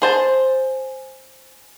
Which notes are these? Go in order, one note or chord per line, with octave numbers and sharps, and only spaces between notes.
G#4 C5 A5